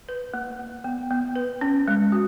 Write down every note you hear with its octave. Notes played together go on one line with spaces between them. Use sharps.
B4
A#3
A#3
B3
B3
B4
C#4
G#3
F#4